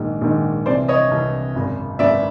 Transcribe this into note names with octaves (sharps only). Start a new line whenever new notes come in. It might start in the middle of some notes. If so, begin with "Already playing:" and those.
Already playing: A#1 G#2 D#3
A#1 G#2 D#3
C2 C3 E3 C5 D5
C#5 D#5
C2 C3 E3
G#1 F#2 C#3
G#1 F#2 C#3 D5 E5